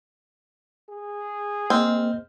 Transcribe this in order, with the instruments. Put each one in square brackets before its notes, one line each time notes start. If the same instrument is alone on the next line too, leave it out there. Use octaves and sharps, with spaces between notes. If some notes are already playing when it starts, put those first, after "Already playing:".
[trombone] G#4
[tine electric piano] A#3 D#5 F6 [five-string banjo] C4